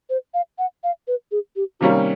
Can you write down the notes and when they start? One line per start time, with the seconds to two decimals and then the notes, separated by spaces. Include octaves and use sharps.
0.09 C5
0.34 F5
0.58 F#5
0.84 F5
1.07 B4
1.31 G#4
1.56 G4
1.80 C3 D#3 G3 A#3 C#4 F#4